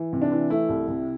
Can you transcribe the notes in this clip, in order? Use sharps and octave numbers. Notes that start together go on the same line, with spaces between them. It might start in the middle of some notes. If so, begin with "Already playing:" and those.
Already playing: E3
C3
D4
E3
A3 E4
C2
C3